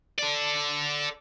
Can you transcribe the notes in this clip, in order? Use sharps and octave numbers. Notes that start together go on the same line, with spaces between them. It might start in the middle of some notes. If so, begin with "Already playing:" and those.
A4 D5